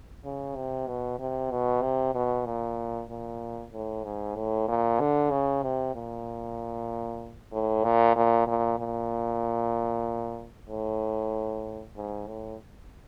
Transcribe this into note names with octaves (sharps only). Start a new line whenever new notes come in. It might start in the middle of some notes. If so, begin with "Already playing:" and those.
C#3
C3
B2
C3
B2
C3
B2
A#2
A#2
A2
G#2
A2
A#2
D3
C#3
C3
A#2
A2
A#2
A#2
A#2
A#2
A2
G#2
A2